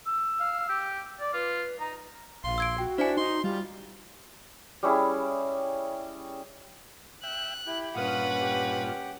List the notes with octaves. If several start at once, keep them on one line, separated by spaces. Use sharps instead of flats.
E6
F5
G4
D5
F4 B4
D#4 A#5
A#1 F5 C6
E6 G#6 D7
F#4 G5
D4 E4 C5 G#5
D#4 C6
G3 F4
G3 C#4 E4 G#4
E5 G5 F#6
E4 G4
G2 A#2 C#4 F4 B4 F5 F#5 D#6
G4